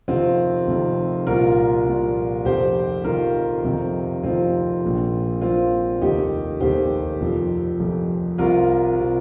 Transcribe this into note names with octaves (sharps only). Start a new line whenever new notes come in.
F1 F2 C3 D#3 C4 F4
F1 F2 C3 D#3
C2 A#2 F3 F4 A#4
C2 A#2 F3
F1 F2 D#3 G4 C5
F1 F2 D#3 F4 A#4
F1 F2 C3 D#3
F1 F2 C3 D#3 C4 F4
A#1 A#2 F3
A#1 A#2 F3 C4 F4
F1 D#2 D#3 D#4 G4
F1 D#2 D#3 G4 C5
F1 F2 F3
F1 F2 F3
C2 C3 F3 F4 A#4
C3 F3